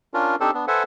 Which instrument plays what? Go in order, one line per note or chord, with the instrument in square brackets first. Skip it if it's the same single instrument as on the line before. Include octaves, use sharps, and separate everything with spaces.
[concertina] C#4 D4 F4 A#4
C4 D4 D#4 G4 A4 C5
B3 D4
A4 B4 C5 E5 F#5 G#5